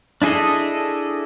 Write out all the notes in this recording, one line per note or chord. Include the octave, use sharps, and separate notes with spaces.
D4 E4 G#4 A4 D#5